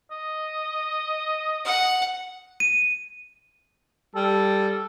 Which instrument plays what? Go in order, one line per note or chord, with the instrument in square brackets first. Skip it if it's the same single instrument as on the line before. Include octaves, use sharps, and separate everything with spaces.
[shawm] D#5
[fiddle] F#5
[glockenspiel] D#7
[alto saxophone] G3 [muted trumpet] A4